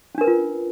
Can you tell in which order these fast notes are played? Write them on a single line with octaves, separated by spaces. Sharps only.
C#4 D4 A#4 B4 F4